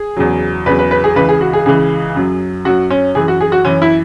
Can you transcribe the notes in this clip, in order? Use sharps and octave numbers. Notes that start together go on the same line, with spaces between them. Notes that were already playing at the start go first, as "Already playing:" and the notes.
Already playing: G#4
E2 C#3 F#3
E2 C#3 F#3 B4
B4
B4
G#4
C#2 C#3 E3 B4
G#4
F#4
G#4
C#2 C#3 E3 G#4
F#2 F#3
F#2 F#3 F#4
C#4
F#2 E3 G#4
F#4
G#4
F#4
F#2 E3 C#4
E4